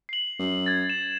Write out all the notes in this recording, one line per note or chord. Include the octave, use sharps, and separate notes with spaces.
C7 F#7
F#2
G#6 A6
E7